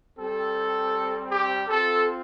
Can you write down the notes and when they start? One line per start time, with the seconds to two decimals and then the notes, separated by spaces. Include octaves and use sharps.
0.18 G3 C4 G4 A4
1.31 G4
1.69 C4 F4 A4